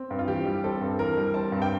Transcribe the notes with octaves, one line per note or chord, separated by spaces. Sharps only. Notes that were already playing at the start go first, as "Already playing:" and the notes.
Already playing: C4
G2
F4
E3 G4
G3
C4 A4
G2
E3 A#4
G3
C4 A5
G2
G5